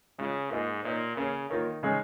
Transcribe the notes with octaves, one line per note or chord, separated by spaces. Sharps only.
C#3 G#3 F4 C#5
G#2 A#3 F4 G#4 D#5
A#2 A#3 D#4 C#5
C#3 A#3 C#4 G#4 C#5
D#3 A#3 F4 A#4 C#5
C#3 G#3 D#4 G#4 C#5